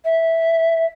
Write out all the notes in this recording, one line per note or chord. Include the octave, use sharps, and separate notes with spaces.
E5